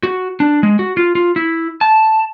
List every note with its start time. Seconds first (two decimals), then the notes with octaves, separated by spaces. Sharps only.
0.03 F#4
0.40 D4
0.63 G#3
0.79 F#4
0.97 F4
1.15 F4
1.36 E4
1.81 A5